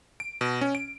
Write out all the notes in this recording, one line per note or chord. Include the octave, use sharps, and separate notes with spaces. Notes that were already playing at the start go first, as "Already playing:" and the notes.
D7
B2
C#4
D7